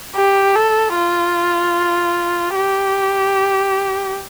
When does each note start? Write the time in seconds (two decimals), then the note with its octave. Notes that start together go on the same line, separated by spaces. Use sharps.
0.15 G4
0.56 A4
0.96 F4
2.56 G4